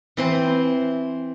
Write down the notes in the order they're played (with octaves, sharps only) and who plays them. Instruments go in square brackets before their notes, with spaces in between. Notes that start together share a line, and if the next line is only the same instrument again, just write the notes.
[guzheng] E3 C4 C5